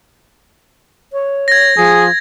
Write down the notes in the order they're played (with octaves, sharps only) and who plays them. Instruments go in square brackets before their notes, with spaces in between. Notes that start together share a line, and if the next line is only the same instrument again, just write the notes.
[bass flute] C#5
[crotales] G#6 A#6
[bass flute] F3 [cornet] G#4